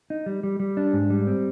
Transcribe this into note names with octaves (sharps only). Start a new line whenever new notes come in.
D#4
G3
G3
G3
D4
G#2
G3
C4